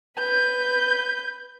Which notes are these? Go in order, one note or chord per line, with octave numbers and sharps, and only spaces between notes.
B4 G6